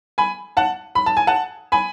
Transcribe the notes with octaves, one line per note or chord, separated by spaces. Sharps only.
G#5 B5
F#5 A5
B5
A5
G#5
F#5 A5
G#5 B5